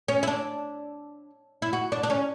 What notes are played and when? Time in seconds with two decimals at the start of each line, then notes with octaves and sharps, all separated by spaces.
0.08 C#4
0.23 E4
0.28 D4
1.62 E4
1.73 F#4
1.92 D4
2.03 D4
2.10 C#4